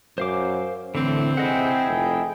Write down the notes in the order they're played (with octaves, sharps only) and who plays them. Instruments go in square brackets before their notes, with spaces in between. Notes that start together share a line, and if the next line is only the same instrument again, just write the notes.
[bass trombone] F#2 [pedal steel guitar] C5 F5 D6
[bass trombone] A2 [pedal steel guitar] D3 E3 [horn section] C4
[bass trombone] C3 [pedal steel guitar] E4 D#5 F#5 [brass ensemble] G#4 G5
[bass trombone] F1